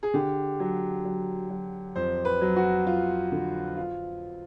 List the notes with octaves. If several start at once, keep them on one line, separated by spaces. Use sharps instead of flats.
G#4
D3 G4
F#3
F#3
F#3
F2 C5
B4
F#3
F#4
F#3 F4
D3
F4